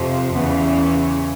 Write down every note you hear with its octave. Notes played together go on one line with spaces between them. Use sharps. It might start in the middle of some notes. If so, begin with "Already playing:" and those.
Already playing: F2 C3 F3
E2 C#3 E3 B3